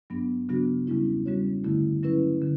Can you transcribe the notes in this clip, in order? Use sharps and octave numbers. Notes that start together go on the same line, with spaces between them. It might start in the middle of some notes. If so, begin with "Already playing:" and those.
G2 F#3 B3 D4
C#3 F#3 B3 D4 F#4
E2 C#3 G3 C#4 E4
G3 C#4 F#4 C#5
G2 D3 A3 E4
F#3 C#4 E4 B4
D3